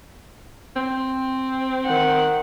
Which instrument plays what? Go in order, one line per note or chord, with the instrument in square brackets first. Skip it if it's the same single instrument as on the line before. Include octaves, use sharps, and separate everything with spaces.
[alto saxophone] C4
[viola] D#3 F#5